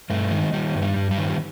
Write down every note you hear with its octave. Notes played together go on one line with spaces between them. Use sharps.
G2 A3
D#3 G#3
D#3 G3
G2
G3
G2
G3
D#3